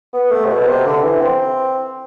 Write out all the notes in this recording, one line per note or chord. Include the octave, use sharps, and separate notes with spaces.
B3
A3
C3
B2
C3
D3
E3
C4